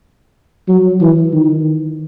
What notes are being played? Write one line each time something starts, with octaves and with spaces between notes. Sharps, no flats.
F#3
E3
D#3